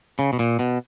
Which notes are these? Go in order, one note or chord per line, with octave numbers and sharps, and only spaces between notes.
C#3
B2
A#2
B2